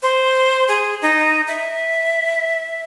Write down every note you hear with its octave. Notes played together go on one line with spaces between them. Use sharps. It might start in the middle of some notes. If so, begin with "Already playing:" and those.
C5
G#4
D#4
E5